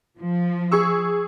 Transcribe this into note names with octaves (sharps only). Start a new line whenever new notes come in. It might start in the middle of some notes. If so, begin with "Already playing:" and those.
F3
G#4 C#6 E6